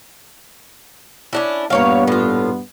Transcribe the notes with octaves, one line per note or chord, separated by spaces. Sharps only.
C#4 D4 E4
G2 A#2 A#3 B3 C#5 F5
A2 F4